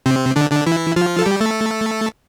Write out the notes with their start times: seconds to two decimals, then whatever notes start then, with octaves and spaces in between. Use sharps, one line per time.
0.06 C3 C4
0.36 D3 D4
0.51 D3 D4
0.66 E3 E4
0.96 F3 F4
1.19 A4
1.26 G3 G4
1.41 A3 A4